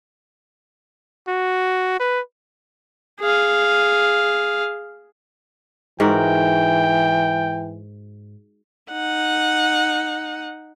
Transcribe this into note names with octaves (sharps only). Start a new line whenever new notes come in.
F#4
B4
G#4 F5
G#2 E3 F#4 A#4 G5
D#4 F#5